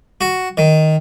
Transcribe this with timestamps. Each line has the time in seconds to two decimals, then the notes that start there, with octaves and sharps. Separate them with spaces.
0.21 F#4
0.57 D#3